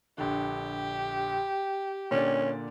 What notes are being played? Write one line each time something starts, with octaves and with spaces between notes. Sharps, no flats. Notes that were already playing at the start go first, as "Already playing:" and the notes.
A#1 D3 G4
A#2 D3 C#4 D5